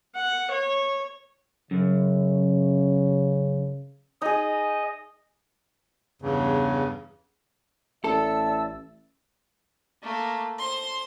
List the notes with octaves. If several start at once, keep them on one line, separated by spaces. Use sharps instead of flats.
F#5
C#5
F#2 C#3
D#4 G#4 D#5
E2 G2 C#3
A1 A4 D5 E5 A5 E6
A3 A#3
C5 C6